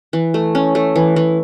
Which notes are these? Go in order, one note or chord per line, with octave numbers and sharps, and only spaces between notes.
E3
A3
C#4
A3
E3
E3